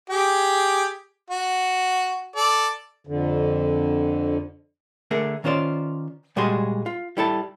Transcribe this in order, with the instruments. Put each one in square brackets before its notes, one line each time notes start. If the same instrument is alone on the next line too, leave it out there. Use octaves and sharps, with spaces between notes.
[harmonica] G4 G#4 G5
F#4
A4 D5
[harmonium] F2 D3
[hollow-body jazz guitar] D3 A3 G#4 A#4
D#3 C#4 F4 C5 D5
A#2 G3 G#3 F#4 G#4 C6
F4
G3 E4 A4 A5